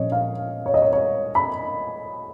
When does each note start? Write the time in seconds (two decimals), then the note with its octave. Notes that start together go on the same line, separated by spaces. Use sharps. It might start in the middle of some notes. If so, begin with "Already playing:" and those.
Already playing: A#2 F3 C#4 C#5 D#5
0.12 F5
0.66 C#5
0.74 D#5
0.82 C#5
0.93 C#5
1.35 B5